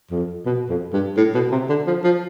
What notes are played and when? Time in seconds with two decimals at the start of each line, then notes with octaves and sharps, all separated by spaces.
0.11 F2
0.46 B2
0.69 F2
0.93 G2
1.17 A2
1.35 B2
1.51 C3
1.69 D3
1.87 F3
2.04 F3